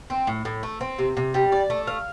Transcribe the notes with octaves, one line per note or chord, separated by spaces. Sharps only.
C4
A2
A2
A3
C4
C3
C3
G3
D5
A3
F5